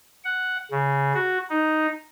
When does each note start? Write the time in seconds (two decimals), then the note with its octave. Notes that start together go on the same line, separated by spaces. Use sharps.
0.24 F#5
0.72 C#3
1.14 F#4
1.50 D#4